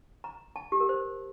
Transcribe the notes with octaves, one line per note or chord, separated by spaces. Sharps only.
A#5
A5
G4
A#4
C5